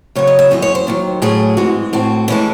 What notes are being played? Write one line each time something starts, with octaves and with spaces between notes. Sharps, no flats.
F#2 C#3 F#3 C#5
D#5
E5
F#2 E3 G#3 D#5
C#5
C5
D#2 D#3 F#3
A2 F#3 C#4 G#4
G#2 E3 G#3 C4 F#4
A2 E3 C4 F#4
A2 E3 G#3 C#4 E4